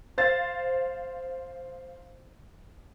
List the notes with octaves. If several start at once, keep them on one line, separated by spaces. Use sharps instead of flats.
C5 F5 A6